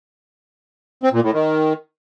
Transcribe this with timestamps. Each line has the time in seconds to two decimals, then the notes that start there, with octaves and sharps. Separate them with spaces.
1.03 C4
1.13 A#2
1.23 A2
1.34 D#3